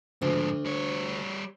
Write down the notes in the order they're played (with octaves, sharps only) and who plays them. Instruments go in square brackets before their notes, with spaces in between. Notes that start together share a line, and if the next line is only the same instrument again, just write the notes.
[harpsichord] D2 [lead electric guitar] G#2 F3
[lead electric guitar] G3 C#5